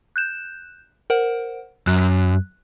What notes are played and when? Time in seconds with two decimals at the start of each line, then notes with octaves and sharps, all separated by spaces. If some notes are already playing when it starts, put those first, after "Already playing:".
0.16 F#6 G6 E7
1.10 A#4 C5 F#5
1.87 F#2 F#6